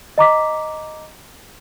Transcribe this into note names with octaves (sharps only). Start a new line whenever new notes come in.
D#5 A#5 D6 B6